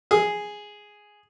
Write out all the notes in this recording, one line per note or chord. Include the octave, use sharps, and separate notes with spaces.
G#4